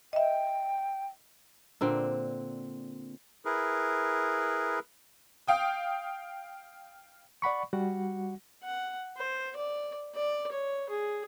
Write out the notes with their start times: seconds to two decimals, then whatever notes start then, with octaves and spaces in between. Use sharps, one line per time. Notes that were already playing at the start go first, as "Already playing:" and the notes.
0.13 D#5 E5 G5
1.81 A#2 D3 C4
3.45 E4 G#4 A#4 B4
5.48 F5 G5 D#6
7.42 D5 F#5 B5 C#6
7.73 G3 F#4 F#5
8.64 F#5
9.17 C5
9.56 D5
10.15 D5
10.52 C#5
10.90 G#4